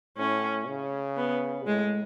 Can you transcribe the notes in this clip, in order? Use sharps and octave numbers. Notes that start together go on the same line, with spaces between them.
A2 C#4
C#3
B3
A2 G#3